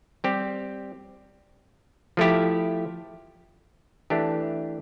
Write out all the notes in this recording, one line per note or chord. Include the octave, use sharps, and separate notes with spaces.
G3 C4 G4
F3 A3 E4 G4
E3 A3 D4 G4